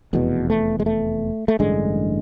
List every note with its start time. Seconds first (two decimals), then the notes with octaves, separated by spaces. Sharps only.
0.13 F1 E2 B2
0.50 A3
0.80 G#3
0.86 A3
1.48 A3
1.59 A1 G2 D3 G#3